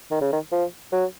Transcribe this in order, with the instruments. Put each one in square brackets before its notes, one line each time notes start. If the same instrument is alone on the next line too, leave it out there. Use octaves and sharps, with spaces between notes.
[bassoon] D#3
C#3
D#3
F3
F#3